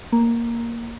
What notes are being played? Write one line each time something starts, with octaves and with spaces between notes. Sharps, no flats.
A#3